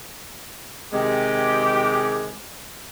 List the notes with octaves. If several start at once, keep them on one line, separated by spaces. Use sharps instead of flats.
C3 D#3 G#3 G4